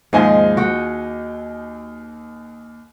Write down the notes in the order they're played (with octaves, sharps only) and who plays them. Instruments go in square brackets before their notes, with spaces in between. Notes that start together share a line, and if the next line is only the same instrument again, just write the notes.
[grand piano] D#2 D#4 G#5 [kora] G#2 F3 G#3
[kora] F#4 G5